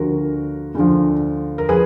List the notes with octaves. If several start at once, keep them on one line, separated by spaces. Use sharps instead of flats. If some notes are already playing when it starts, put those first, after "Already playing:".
Already playing: D2 D3 F3 F#4 A#4
D2 D3 F3
A#4
F3 G#4 B4